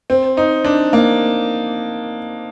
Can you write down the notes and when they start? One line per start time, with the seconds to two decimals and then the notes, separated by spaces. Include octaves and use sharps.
0.10 C4
0.37 D#4
0.65 D4
0.93 A#3